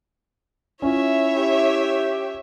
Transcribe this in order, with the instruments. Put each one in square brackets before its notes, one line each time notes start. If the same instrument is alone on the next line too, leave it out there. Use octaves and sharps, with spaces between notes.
[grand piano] C#4 F4 [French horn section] E4 [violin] C#5 E5
[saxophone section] G4